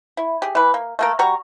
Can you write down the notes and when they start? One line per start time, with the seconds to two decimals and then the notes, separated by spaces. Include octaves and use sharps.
0.17 E4
0.42 G4 G#4
0.55 E3 B4
0.74 A#3
0.99 A3 A#3 A#4
1.19 G3 F#4 A#5 C#6